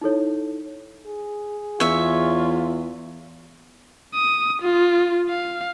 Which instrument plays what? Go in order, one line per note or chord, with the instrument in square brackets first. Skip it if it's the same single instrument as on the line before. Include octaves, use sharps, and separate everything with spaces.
[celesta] D#4 E4 A4 C#5
[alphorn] G#4
[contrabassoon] E2 [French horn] F4 [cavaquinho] C#5 E5
[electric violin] D#6
F4
F5